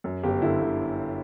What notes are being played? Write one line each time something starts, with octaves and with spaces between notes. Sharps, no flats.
F#2
G1 G4
D3 E4
G1